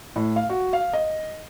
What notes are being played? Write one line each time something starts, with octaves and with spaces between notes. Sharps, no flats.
A2
F5
F#4
F5
D#5